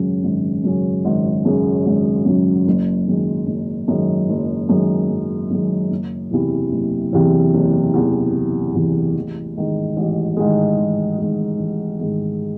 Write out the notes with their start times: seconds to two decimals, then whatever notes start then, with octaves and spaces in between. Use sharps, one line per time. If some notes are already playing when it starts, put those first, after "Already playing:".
Already playing: G#1 F#2 C#3 F#3 C#4
0.23 G#1
0.64 F#2 C#3 F#3 C#4
1.05 G#1
1.45 F#2 C#3 F#3 C#4
1.86 G#1
2.25 F#2 C#3 F#3 C#4
2.67 F#1
3.08 F#2 D#3 G#3
3.48 F#1
3.88 F#2 D#3 G#3
4.29 F#1
4.69 F#2 D#3 G#3
5.09 F#1
5.51 F#2 D#3 G#3
5.91 F#1
6.31 E2 C3 E3
6.72 F#1
7.13 E2 C3 E3
7.54 F#1
7.94 E2 C3 E3
8.34 F#1
8.75 E2 C3 E3
9.15 A1
9.56 G#2 D#3 G#3
9.97 A1
10.37 G#2 D#3 G#3
10.78 A1
11.18 G#2 D#3 G#3
11.59 A1
12.00 G#2 D#3 G#3